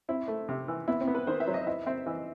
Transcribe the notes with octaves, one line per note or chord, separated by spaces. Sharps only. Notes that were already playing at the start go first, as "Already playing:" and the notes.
C4 E4
A3
C3
E3
B3 E4
C4
B3
B4
D#3 C5
E5
F#3
D#5
E4 E5
C4 E5
E3 D#5